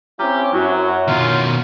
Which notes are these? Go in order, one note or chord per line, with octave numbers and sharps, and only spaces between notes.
C4 C#4 E4 G4 A#5 F6
F#2 F#3 E4 F#4 C#5
B2 D#3 F4